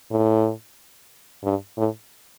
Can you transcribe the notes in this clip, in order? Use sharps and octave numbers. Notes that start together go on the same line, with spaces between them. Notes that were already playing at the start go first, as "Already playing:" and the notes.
A2
G2
A2